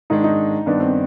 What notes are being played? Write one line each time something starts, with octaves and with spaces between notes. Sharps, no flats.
G#2 D#3 G#3 D4 D#4
D#4
G2 D#3 B3 D4 D#4
C4